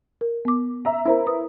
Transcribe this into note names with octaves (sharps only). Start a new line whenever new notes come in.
A#4
B3 D6
E5 A#5
E4 A#4 C5 E5 A#5
B4 D#6